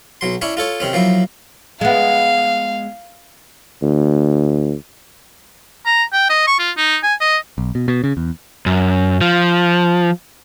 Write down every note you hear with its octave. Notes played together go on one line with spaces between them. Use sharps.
B1 F#3 C6
C#4 D4 E4 C#5
F4 A4 C#5
C3 D#3 C4 C#4
F3 F#3 A#3 E4
G#3 B3 F5
D2
A#5
G5
D#5
C#6
F4
D#4
G#5
D#5
B1
B2
B2
C#3
E2
F#2
F3